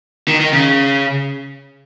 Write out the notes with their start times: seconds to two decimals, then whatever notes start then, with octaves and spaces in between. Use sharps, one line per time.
0.28 D#3
0.40 D#3
0.53 C#3